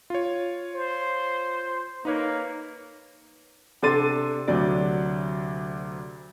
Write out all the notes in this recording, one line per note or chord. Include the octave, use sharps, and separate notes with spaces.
F4 C#5
C5
A#3 D#4 B4 C#5
C3 D4 A4 C6 A6 D#7
D2 C3 F#3 D4 D5